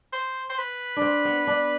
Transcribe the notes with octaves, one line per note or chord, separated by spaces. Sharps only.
C5
C5
B4
D4
C4
B3
D4